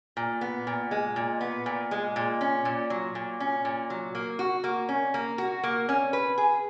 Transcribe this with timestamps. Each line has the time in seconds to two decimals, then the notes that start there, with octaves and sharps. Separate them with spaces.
0.17 A#2
0.41 B3
0.67 A#2
0.91 G#3
1.16 A#2
1.41 B3
1.66 A#2
1.91 G#3
2.16 A#2
2.41 C#4
2.65 A#2
2.90 F#3
3.15 A#2
3.40 C#4
3.65 A#2
3.90 F#3
4.15 A#3
4.39 F#4
4.64 A#3
4.89 C#4
5.14 A#3
5.38 F#4
5.63 A#3
5.89 C#4
6.13 B4
6.38 G#4